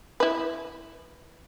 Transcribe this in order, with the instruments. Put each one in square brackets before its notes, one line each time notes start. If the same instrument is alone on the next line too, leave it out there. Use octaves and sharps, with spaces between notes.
[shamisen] E4 B4